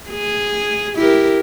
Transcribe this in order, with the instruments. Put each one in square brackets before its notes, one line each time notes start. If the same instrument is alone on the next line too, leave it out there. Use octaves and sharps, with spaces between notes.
[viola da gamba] G#4
E4 G4 A#4